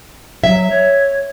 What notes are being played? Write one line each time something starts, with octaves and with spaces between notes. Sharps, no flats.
F#3 E5
C#5